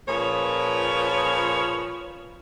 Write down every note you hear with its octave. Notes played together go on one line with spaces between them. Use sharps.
A#2 F3 C#4 G#4 B4 C#5